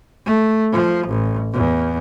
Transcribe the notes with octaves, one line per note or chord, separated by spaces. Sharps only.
A3
F3
A1
E2